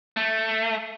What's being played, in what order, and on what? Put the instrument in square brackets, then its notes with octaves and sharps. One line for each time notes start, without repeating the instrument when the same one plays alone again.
[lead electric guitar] A3